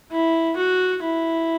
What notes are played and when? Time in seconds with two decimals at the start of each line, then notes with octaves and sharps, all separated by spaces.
0.11 E4
0.56 F#4
1.02 E4